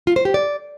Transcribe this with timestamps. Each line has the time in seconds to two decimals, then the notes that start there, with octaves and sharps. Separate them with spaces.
0.07 F4
0.16 C5
0.25 G4
0.34 D5